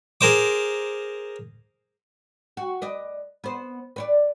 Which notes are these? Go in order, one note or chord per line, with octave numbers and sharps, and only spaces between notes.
G#4 A#4 C5 D6
F#4
B4 D5 D#5
B3 C5
B4 C#5 D5